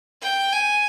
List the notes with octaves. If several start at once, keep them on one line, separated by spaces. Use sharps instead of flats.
G5
G#5